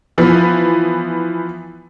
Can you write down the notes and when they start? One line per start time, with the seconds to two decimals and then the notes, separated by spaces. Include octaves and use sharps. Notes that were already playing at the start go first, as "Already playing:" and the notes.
0.18 E3 F3 B3